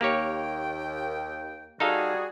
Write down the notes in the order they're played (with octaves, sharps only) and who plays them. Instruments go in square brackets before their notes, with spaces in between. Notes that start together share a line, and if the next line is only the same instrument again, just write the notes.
[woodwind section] D#2 G5 [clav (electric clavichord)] A#3 G4 C#5
[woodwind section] G3 F#4 G#4 [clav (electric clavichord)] D#4 A4 F5